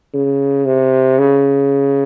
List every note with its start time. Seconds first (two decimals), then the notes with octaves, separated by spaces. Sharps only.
0.14 C#3
0.66 C3
1.19 C#3